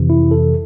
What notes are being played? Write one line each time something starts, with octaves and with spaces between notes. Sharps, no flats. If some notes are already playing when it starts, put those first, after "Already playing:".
Already playing: F2 C3 E3
E4
A4